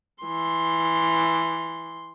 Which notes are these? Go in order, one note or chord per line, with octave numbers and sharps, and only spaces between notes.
E3 C6